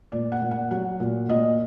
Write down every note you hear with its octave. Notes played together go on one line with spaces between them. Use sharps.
A#2 D5
F#5
A#2
F#5
F#3 F#5
A#2
A#2 D#5